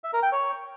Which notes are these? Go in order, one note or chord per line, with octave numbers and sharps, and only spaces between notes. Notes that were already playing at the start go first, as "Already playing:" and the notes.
E5
A#4
G5
C#5